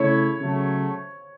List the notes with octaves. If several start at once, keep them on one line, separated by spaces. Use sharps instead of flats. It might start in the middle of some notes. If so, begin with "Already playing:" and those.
Already playing: C#3 A3 E4 C#5
C#3 F#3 A3